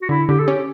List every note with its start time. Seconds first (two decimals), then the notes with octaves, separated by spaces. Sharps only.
0.02 F#4
0.09 D3 E4
0.29 D3 G4
0.39 A4
0.48 C#4 G4